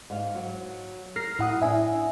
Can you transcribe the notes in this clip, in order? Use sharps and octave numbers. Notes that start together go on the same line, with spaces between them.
G#2 F5
F#3
A#4 F6 A#6 C7
A2 F#3 E4 F#5 D#6
C#4 D4 E4 E5 G#5